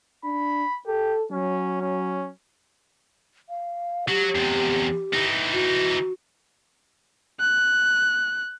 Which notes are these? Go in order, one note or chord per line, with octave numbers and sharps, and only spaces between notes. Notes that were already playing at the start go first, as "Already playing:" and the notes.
D4 B5
G4 A4
F#3 C#4
C#4
F5
F#3 G4
E2 C3
E3 D#4
F#4
F#6